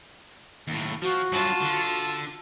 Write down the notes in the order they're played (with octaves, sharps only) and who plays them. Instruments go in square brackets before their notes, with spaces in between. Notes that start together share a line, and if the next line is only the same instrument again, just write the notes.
[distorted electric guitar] D#2 A2
[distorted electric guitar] F3 [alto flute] F#4
[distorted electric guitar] G2 F#3 [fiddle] F4 A5
[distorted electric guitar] D3